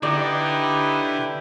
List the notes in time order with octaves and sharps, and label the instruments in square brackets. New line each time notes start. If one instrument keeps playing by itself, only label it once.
[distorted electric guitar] D3 [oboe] D#4 [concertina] E4 G4 B4 [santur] D5